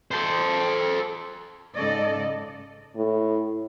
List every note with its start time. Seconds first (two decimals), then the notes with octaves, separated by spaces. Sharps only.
0.11 A4 C5
1.74 G#2 C#3 A4 D5 D#5
2.96 A2